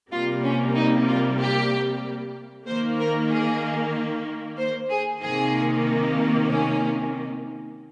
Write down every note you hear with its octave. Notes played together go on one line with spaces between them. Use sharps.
C3 G3 A#3 F4
C#4
D#4
F4
G4
D#3 A#3 C5
A#4
G#4
C5
G#4
C3 D#3 A#3 G#4
C#4